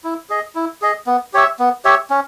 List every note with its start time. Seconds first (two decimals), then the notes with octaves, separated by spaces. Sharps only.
0.04 E4
0.30 G#4 D#5
0.55 E4
0.82 G#4 D#5
1.07 B3
1.33 G4 C#5 E5
1.59 B3
1.85 G4 C#5 E5
2.10 C#4